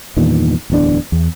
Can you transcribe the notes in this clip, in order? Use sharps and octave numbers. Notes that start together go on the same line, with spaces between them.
E2 G2 A#2 D#3
D1 E2 D4
E2